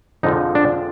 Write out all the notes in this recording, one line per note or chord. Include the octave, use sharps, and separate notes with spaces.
F2 D3 F3 G#3 D#4
D4